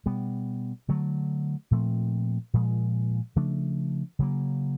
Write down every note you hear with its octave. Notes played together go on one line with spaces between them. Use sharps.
B2 G3 B3
D3 F#3 A3
A#2 F3 A3 C4
A#2 F3 G#3
C#3 F3 A3 D4
C#3 F#3 A#3